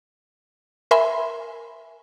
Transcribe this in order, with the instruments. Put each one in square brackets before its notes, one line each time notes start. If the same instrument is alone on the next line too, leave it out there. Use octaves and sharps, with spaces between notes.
[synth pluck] A#4 E5 G#5 B5 C6